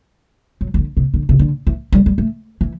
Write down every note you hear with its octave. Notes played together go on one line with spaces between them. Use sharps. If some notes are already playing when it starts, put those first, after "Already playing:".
F#3
E3
D3
C3
D3
C3
D3
E3
G3
G3
A3
E3